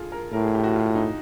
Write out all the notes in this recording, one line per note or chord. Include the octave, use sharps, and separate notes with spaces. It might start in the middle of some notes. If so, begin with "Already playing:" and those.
Already playing: F4 G#4 A4
A#4
A2 A#4
G#4
G4
F#4
F4
D#4